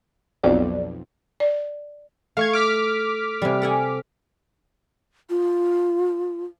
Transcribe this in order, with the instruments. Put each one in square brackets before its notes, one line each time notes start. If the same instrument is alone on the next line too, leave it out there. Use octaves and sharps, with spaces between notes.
[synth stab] B1 F2 [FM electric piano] D5
[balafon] D5
[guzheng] A3 [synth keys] F5 C#6 G#6
[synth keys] D6 F6 B6
[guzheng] C3 G3
A4 F#5 G#5
[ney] F4